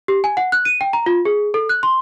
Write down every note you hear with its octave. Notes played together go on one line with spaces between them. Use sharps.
G4
G#5
F#5
F#6
D#7
G5
A#5
F4
G#4
A4
F#6
C6